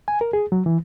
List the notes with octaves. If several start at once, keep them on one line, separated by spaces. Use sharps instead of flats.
G#5
A#4
G#4
F#3
E3